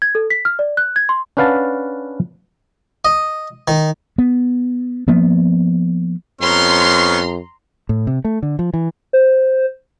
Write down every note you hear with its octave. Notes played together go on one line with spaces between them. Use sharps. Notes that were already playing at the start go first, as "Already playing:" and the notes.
G#6
A4
B6
F6
D5
F#6
G#6
C6
C#4 D4 B4 F5 F#5 A5
D#5
D#3
B3
F3 A#3 B3
F2 B3 C#4 A#5 C6
A2
C3
A3
D3
F3
E3
C5